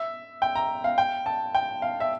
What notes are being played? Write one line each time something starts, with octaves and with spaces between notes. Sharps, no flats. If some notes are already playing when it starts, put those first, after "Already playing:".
Already playing: E5
G5
A#5
F5
G5
A5
G5
F5
E5